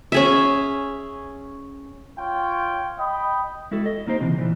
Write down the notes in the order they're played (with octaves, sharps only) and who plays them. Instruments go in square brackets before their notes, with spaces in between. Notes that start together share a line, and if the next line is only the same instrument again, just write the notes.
[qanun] C#4 G#4 E5
[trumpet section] F4 C#5 G5
D#5 G5 B5
[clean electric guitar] G#3 E4 F#4 A4
D#5
A#3 D#4 G4 C5
C#2 C3 E3
A#2 E3